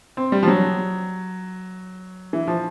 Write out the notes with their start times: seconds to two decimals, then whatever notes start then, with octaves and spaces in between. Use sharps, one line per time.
0.17 C4
0.32 G3
0.43 F3
0.48 F#3
2.33 E3
2.48 F3